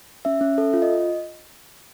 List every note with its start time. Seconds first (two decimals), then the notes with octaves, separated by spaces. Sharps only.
0.25 C#4 E5
0.41 C#4
0.58 A4
0.73 F4
0.82 D#5